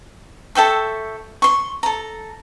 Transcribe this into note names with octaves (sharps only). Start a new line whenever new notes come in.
A4 E5 G5 C#6
C6 C#6
A4 A#5